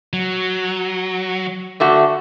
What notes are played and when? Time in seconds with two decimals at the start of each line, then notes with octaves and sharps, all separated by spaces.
0.13 F#3
1.80 D3 A3 F#4